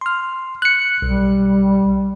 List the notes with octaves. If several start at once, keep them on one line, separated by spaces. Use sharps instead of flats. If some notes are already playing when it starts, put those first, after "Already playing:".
C6 F6
F#6 C#7
B1 G3